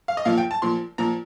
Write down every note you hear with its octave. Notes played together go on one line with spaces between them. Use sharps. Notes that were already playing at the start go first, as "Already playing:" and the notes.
F5
D#5
A#2 F3 F5
G5
A5
A#2 F3 C6
A#2 F3 A#5